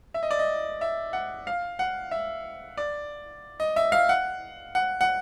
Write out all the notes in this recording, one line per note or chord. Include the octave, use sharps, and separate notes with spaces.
E5
D#5
D5
D#5
E5
F#5
F5
F#5
E5
D5
D#5
E5
F5
F#5
F#5
F#5